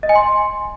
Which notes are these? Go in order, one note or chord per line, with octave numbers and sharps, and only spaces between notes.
D#5
G#5
C6